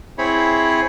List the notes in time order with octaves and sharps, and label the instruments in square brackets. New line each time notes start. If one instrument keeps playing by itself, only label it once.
[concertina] C4 E4 G#4 C#5 B5